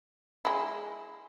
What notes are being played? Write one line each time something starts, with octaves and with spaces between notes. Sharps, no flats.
G#3 E4